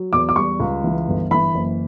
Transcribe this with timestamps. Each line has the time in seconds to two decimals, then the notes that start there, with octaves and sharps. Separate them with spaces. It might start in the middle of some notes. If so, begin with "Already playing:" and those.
Already playing: F#3
0.13 E2 D6
0.29 D6
0.36 G3 C#6
0.60 C#2
0.84 E3
1.08 G1
1.31 E3 B5
1.55 F#1